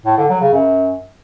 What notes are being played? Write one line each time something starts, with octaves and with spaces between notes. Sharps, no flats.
A2
D3
F#3
C#3
F#2